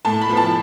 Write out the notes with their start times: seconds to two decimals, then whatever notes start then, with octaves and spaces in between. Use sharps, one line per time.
0.05 A2 A5
0.21 B5
0.29 F3 B3
0.37 A5